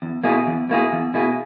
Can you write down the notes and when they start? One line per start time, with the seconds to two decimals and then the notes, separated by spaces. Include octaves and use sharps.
0.02 E2
0.24 B2 A#3 E4 G#4
0.47 E2
0.69 B2 A#3 E4 G#4
0.92 E2
1.14 B2 A#3 E4 G#4